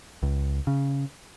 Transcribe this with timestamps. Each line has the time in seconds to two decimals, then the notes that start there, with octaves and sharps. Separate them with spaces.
0.23 C#2
0.67 C#3